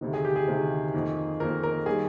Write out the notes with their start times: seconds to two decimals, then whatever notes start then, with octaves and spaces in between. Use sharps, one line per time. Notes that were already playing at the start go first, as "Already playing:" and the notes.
0.01 D2 C3 D#3
0.13 G#4
0.25 G4
0.36 G#4
0.48 D2 C3 D#3
0.94 F2 D#3 A#3
1.40 F2 D#3 A#3 A#4
1.63 A#4
1.86 D#3 G3 A#3 G#4